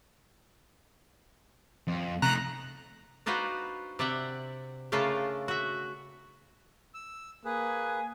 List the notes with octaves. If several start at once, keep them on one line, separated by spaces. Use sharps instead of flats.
F2
C3 A3 D#4 A#5 F#6
D4 D#4 F4 F#4 B4 C5
C3 D5 E5 F#5 G5
C#3 A3 D4 F4 A4 A#4
F#4 E5
E6
A#3 G#4 B4 G#5